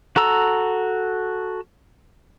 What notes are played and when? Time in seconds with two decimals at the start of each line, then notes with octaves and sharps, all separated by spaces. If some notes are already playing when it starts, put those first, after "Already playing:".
0.16 F#4 A4 A#5 E6